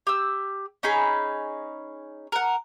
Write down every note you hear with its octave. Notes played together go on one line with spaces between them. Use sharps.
G4 E6
C#4 D#4 G#4 B5
A#4 F#5